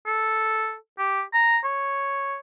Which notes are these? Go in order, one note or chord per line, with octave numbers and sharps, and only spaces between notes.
A4
G4
A#5
C#5